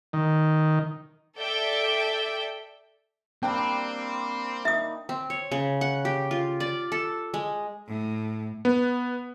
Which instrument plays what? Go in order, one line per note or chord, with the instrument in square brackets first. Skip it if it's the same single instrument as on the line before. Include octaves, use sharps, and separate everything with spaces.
[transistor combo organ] D#3
[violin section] A4 D5 E5 G5
[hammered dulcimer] G3 A#3 D4 [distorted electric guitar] C4 [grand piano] G5
[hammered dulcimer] D#4 [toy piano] E5 D#6
[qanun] C4
C#5
C#3
F#5
G4
F4
D5
A4
G#3
[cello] A2
[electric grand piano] B3